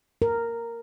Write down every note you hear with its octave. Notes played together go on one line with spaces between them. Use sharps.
A#4